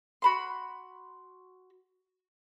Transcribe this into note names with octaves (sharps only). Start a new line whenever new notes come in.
F#4 B5 C6